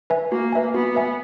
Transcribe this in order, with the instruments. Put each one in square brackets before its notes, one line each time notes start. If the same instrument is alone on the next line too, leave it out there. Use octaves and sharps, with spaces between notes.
[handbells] B4 E5 G#5
[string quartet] A#3 [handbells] F#4
[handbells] B4 E5 G#5
[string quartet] B3 [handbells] F#4
[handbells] B4 E5 G#5